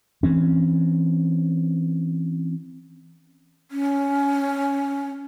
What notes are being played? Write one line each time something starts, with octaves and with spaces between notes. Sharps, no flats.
E3 C4 C#4
C#4